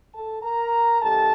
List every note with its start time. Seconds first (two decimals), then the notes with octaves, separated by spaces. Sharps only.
0.13 A4 A5
0.42 A#4 A#5
1.01 C3 D#3 G3 A4 A5